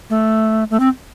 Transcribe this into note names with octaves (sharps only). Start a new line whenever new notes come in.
A3
A3
C4